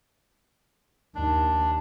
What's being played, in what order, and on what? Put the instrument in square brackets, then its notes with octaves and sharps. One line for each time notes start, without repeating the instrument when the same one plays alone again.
[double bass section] D#2 [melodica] D4